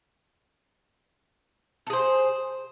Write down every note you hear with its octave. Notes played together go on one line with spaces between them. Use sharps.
G#4 A4 C5